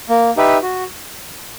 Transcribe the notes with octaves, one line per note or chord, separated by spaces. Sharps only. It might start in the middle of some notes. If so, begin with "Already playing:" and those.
A#3
D#4 G4 B4 E5
F#4